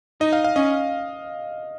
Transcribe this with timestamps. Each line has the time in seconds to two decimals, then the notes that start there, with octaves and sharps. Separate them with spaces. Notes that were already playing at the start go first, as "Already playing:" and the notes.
0.21 D#4 D#5
0.33 F5
0.44 F5
0.56 C#4 D#5